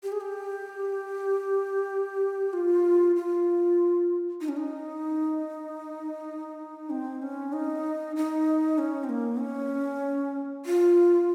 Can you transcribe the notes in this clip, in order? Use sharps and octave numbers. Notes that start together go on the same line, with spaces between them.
G4
G#4
G4
F4
F4
D#4
C#4
D#4
C4
C#4
D#4
D#4
C#4
C4
A#3
C#4
F4